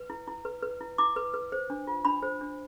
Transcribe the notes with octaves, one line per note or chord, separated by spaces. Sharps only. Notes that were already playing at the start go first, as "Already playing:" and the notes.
Already playing: B4
E4
E4
B4
B4
E4
E4 D6
B4
B4
C5
D4
F4
D4 B5
C5
D4